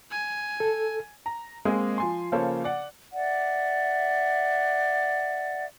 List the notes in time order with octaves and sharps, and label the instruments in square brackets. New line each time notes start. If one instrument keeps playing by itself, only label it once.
[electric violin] G#5
[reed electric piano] A4
[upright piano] A#5
G#3 A#3 C4 G#4 D#5
F3 G#5 C6
C#3 F3 A#3 A4 C5 C#5
D5 F#5
[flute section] D5 E5 F#5